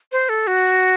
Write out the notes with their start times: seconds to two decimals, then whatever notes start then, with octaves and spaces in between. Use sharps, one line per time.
0.12 C5
0.29 A4
0.47 F#4